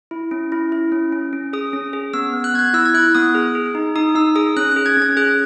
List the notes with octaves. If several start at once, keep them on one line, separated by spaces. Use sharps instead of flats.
E4
C#4
E4
E4
C#4
C#4
C#4
G#4 D#6
C#4
G#4
B3 E6
B3
F#6
B3 G#6
F#6
E4 E6
G#6
E4 F#6
B3 D#6
G#4
G#4
D#4
D#4 D#6
D#4 E6
G#4 D#6
C#4 F#6
G#4 F#6
G#6
C#4 G#6
G#4 F#6